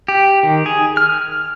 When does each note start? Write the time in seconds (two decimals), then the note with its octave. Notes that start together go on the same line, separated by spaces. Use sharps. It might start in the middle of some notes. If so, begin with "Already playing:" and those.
0.08 G4
0.43 D#3
0.66 G#4
0.97 F6